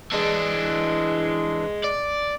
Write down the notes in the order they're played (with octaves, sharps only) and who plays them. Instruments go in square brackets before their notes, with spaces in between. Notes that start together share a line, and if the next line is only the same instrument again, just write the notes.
[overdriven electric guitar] E3 D4 [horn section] G#3
[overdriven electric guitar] D5